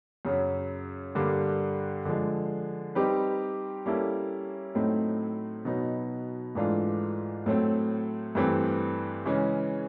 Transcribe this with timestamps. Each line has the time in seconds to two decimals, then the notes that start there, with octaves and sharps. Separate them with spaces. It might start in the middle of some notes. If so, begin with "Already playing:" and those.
0.25 F#2 C#3 F#3
1.15 G2 D3 G3 A#3
2.05 D3 F3 G#3
2.95 G3 C4 D#4 G4 B4
3.86 G3 A#3 C#4 E4 A4
4.75 A2 F#3 A3 C4 D#4
5.65 B2 F#3 B3 D#4
6.55 G#2 E3 A3 D4 F4
7.46 A2 F#3 A3 C4
8.35 G2 E3 A3 C4
9.26 C#3 E3 G#3 C#4